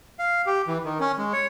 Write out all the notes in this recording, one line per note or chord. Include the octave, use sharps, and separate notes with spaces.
F5
G4
E3
D#3
C#4
G#3
C#5